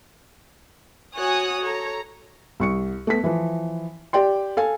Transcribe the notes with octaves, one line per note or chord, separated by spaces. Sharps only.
F#4 C#5 G#5 D#6 F#6
A4 C#5 A#5
C2 C#6 C#7
A3 B3 B6
E3 F3
G4 D5 G5 C6
A4 F5 G#5